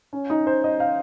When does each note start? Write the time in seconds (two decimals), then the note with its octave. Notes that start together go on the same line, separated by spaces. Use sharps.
0.13 C#4
0.30 D#4
0.47 C5
0.64 D#5
0.80 F5